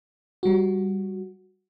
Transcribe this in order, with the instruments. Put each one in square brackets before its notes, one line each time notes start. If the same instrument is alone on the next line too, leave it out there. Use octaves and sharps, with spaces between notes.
[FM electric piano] G3 F#4